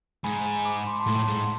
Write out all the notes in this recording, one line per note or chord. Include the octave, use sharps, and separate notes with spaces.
G#2 G#5 B5
B5 D6
C6
D6
A5 C6
A2
G#2